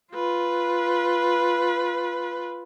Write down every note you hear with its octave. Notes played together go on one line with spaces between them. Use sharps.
F4 B4